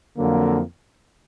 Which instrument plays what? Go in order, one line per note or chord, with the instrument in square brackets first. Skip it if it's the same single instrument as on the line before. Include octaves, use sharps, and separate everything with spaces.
[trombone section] F2 D3 F#3 A#3